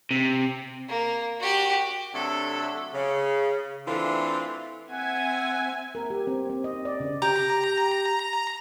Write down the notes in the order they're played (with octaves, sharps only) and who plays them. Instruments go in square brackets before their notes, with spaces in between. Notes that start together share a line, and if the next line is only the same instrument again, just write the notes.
[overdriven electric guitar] C3
[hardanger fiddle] A#3
F#4 G4
[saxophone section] C3 F#3 A3 D4 A4
C#3
E3 A3 C4 D4 F4
[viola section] C4 E5 G#5 [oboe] F#5
[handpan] A#4
G4
C4
C4
D#5
D5
C#3
[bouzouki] G4 [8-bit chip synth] A#5